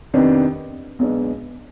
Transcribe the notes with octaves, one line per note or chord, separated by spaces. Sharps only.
F2 C3 D#3 B3 D4
B1 B2 G#3 B3 D4